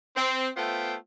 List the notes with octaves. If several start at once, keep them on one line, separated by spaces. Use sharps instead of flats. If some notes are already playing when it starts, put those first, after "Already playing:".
C4
A3 B3 F4 C5 E5 G5